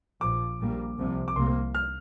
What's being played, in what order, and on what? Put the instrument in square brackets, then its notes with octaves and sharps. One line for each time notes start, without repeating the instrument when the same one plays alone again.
[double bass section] A#1 A#2 F3 [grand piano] D6
[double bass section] A#1 A#2 G3 A#3
C2 C3 F3
[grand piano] D6
[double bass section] C2 C3 A#3 [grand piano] C6
[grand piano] F6